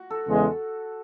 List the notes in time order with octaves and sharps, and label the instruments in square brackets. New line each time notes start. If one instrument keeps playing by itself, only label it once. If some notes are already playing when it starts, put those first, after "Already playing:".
Already playing: [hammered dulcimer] F#4
A4
[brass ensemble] E2 C#3 G#3